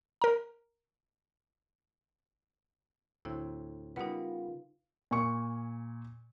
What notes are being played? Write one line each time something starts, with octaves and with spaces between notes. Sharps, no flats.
A#4 A#5
D2 A2 C4 E4
C#3 G3 B3 D#4 F4 A#4 B4 F#5
A#2 G#5 C#6 C#7